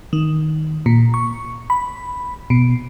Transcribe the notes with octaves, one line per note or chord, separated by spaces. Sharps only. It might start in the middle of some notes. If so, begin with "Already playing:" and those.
D#3
A#2
C#6
B5
B2